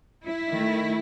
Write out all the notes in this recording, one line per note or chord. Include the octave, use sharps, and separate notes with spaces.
E4
D#3 A3